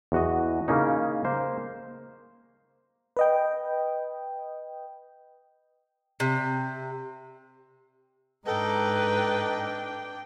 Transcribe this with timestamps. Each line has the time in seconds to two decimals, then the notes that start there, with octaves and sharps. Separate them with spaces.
0.12 E2 F#4 D#5
0.68 C#3 A#3 C#4 D#4
1.25 A#3 C5
3.17 B4 D#5 G5
6.20 C3
8.46 G#2 D4 A4 B4 D#5 G5 A#5